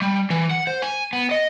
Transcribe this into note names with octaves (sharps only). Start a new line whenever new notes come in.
G3
E3
F#5
C5
G#5
B3
D#5